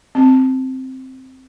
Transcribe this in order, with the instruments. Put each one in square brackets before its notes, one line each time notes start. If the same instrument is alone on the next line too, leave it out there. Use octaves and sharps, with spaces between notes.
[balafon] C4